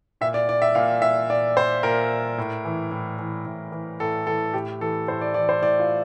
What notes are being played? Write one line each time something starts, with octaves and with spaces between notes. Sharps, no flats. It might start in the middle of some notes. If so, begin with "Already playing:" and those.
A#2 E5
D5
D5
E5
A#2 F5
E5
A#2 D5
C5
A#2 A#4
A2
E3
A2
E3
A2
E3
A2 A4
E3 A4
A2 G4
E3 A4
A2 C5
D5
E3 D5
C5
A2 D5
F4